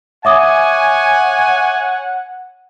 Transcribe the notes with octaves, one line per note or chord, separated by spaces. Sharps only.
C#5 E5 F#5 G#5 D6 D#6